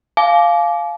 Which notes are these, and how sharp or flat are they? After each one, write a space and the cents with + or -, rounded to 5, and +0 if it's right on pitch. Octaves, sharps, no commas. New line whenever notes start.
F5 +0 G#5 +45 D6 -10